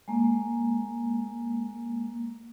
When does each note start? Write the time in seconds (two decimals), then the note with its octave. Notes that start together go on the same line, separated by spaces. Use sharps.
0.08 G#3 A#3